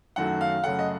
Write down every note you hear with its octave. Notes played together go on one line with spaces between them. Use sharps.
F#2 D#3 F#3 A3 F#5
F5
F#2 C#3 A3 F#5
D#5